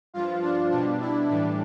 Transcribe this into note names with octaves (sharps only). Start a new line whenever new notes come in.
G2 F3 F4
D4
B2 G3 D4
E4
A2 E3 G3 D4